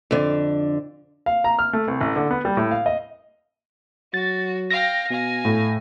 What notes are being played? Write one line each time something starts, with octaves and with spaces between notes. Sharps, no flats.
F2 D3
F5
A#5
F6
A3
C2
A1
D3
B3
G3
A2
F5
D#5
F#3 F#4 A6
F5 G5 A#6
B2 F5 G#5
A2